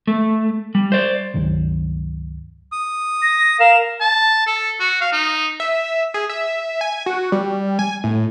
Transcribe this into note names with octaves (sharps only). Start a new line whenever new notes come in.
A3
G3
C5 D5
C#2 G2 D#3 F#3
D#6
A#6
A#4 F5 E7
A5
A4
F#4
F5
D#4
E5
G#4
E5
G#5
F#4
G3
G#5
A2